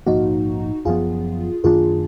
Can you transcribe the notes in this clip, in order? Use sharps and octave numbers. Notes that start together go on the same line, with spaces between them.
A#1 G#2 F3 A#3 D#4 F#4
F#1 F#2 F3 B3 F4 G#4
F#2 D#3 A#3 D4 F4 G#4